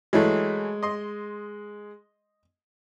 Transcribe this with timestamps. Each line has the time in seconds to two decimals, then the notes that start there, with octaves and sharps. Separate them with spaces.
0.13 E3 F#3 G#3 A3
0.83 D#5 C6